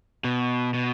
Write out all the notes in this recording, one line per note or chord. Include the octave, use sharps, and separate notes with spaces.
B2
B2